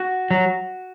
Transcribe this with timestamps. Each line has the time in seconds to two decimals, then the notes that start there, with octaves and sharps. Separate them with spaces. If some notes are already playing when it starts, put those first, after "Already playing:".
Already playing: F#4
0.31 F#3